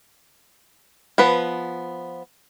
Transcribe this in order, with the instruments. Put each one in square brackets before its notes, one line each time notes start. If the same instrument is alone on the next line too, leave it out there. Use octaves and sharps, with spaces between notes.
[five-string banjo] F3 B3 B4